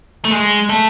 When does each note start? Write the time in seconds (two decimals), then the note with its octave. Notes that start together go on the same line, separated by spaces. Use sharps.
0.25 A3
0.32 G#3
0.69 A3